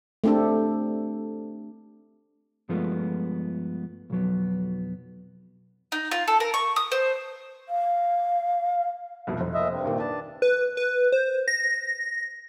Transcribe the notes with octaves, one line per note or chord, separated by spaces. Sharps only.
A3 C4 D4 G4 A4
G2 F3 G#3 A3 B3 F4
B1 F2 F#3 B3
D#4
F4
A4
A#4
C#6
D#6
C5
F5
C2 F2 B2
F1
A#2 D#5 E5
G2 C3
D#2 A#2 D#3
D4 B4 A5
B4
B4
C5
A#6